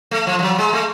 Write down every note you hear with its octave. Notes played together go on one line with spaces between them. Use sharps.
A3
F3
F3
F#3
G#3
A3